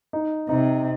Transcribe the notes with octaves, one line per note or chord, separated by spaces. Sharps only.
D#4
C3 D#4